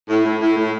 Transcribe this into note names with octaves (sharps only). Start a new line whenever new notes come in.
A2
A2
A2
A2